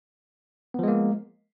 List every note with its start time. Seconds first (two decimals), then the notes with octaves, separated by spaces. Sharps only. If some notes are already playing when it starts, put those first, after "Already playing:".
0.74 B3
0.79 F3
0.83 G#3
0.88 A#3